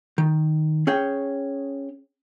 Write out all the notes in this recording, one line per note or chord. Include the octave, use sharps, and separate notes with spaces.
D#3
C#4 G#4 C#5 G5